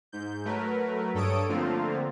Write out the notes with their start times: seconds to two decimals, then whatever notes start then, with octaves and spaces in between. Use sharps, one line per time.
0.12 G#2 G6
0.45 F#3 A3 A#4 B4
1.14 G2 A4 C#5 D#6 D7
1.49 D3 F3 A3 A#3 C4 F4